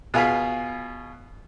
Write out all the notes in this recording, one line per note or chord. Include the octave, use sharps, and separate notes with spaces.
B2 F4 G#4 F5 G#5 B5